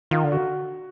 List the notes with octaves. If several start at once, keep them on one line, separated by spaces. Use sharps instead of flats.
D#3 F4
D3
F#4